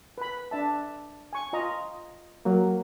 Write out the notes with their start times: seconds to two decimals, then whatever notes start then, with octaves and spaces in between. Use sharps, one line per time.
0.18 B4 B5
0.51 D4 E5 A5
1.33 G#5 C#6
1.53 F4 D#5 A#5
2.45 F#3 A#3